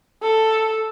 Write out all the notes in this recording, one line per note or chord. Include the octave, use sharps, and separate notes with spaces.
A4